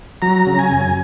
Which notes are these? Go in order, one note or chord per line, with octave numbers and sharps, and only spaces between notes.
F#3 A#5
C#3
G#5
F#2